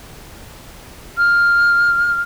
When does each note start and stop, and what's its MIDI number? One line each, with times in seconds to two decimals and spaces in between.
1.18 2.20 89